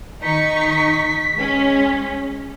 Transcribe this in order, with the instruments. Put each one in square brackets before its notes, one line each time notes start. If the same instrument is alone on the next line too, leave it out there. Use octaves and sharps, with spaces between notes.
[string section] D#3 D#4 C#6 [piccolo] B6
[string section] G#3 C#4